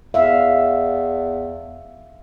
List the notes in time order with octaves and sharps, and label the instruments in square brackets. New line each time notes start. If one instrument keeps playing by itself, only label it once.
[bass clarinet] E2 [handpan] E5 F5